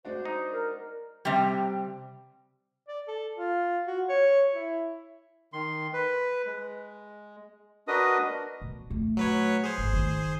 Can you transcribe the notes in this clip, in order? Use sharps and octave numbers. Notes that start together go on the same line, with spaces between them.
G#3 D4 F#4 C5
D#4
A#4
C3 G3
D5
A4
F4
F#4
C#5
E4
D#3 C6
B4
G#3
D4 F#4 A#4 B4 D#5 D#6
B2
A#2 A3
F#3 B4 C#5
G#4 C5
G#1
D#3 D#4